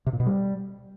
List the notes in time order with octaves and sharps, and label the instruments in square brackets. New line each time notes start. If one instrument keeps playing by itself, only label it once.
[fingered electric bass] C3
A#2
B2
G3